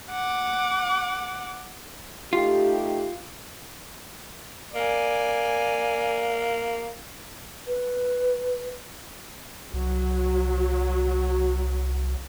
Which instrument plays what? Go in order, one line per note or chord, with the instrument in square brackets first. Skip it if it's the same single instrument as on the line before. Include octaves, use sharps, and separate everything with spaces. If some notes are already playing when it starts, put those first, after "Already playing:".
[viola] F#5 D6
[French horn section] A3 D#4 G4 [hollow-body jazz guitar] F4
[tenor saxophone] A#3 [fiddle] D5 G#5
[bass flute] B4
[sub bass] C2 [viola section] F#3